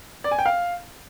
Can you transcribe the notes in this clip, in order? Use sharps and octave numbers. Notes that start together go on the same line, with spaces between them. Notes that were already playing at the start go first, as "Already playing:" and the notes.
D5
G#5
G5
F5